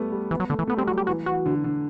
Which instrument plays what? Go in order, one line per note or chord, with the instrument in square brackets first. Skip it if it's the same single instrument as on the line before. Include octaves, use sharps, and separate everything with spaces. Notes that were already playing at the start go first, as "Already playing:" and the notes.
Already playing: [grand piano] G3 A3 B3
G3
[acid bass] E3 [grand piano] B3
[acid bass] F#3
[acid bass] D3 [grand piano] A3
[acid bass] E3
[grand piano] A3 [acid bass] B3
[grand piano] G3 [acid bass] C4
[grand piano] F#3 [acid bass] F#4
[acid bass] G4
[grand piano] E3 [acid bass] F#4
[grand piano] E3 [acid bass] F#4
[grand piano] D3
D3